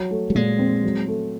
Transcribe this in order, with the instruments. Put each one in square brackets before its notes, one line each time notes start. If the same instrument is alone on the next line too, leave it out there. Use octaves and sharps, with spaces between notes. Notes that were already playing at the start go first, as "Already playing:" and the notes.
Already playing: [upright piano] F#3
A3
[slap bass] G3
[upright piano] A#2 [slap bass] G#3
[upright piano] C4
F#3
A3